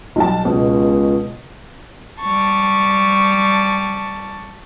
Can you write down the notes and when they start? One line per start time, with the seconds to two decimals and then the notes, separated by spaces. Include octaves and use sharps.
0.16 B1 G3 A5
0.45 C#2 B2
2.21 G3 A5 C#6